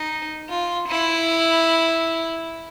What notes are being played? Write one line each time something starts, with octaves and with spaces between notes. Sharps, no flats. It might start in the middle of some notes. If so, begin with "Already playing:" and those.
Already playing: D#4
F4
E4